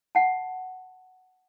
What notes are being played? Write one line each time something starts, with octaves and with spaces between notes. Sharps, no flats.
F#5 A5